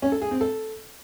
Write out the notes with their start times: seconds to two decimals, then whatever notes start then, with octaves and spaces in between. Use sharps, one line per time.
0.02 C#4
0.12 A4
0.22 G#4
0.31 C4
0.41 A4